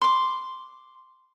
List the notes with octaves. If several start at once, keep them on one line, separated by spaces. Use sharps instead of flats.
C6 D6